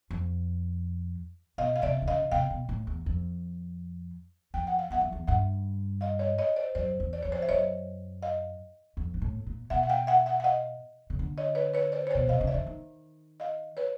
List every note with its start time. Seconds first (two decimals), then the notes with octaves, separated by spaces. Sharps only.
0.11 F2
1.58 B2 D#5 F5
1.76 F5
1.82 C3 D5 E5
2.02 D3
2.08 C#3 D#5 F5
2.32 C3 F5 G5
2.50 B2
2.69 A2
2.87 E2
3.06 F2
4.54 F2 G5
4.67 F#5
4.79 F5
4.90 E2 E5 F#5
5.01 F2
5.12 E2
5.27 G2 E5 F#5
6.01 D#5 F5
6.19 C#5 D#5
6.39 C#5 D#5
6.56 C5 D5
6.75 F#2 C5 D5
7.00 E2
7.13 D5
7.23 F2 C#5
7.32 C5 D5
7.42 E5
7.49 F#2 C#5 D#5
8.23 D#5 F5
8.97 F2
9.14 G#2
9.22 A2
9.46 A#2
9.70 B2 E5 F#5
9.83 F#5
9.89 F5 G5
10.07 E5 F#5
10.26 E5 F#5
10.40 F#5
10.44 D#5 F5
11.10 C#3
11.19 D3
11.38 C#5 D#5
11.55 B4 C#5
11.74 B4 C#5
11.92 C5 D5
12.07 C#5
12.11 B2 C5 D5
12.27 C3 D#5 F5
12.41 C#3
12.47 D5 E5
12.54 D3
12.66 D#3
13.40 D#5 F5
13.77 B4 C#5